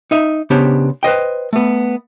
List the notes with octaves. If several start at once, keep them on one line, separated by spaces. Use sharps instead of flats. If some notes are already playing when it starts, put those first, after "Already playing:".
D#4 D#5 E5
C#3 B3 D4 G4 C5 C#5
B4 C5 D#5 G5
A3 B3